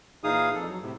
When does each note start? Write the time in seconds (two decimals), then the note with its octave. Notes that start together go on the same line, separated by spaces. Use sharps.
0.24 A#2 E3 D#4 G#4 F5 D#6
0.54 F2 A4
0.68 F#3
0.82 A2 C3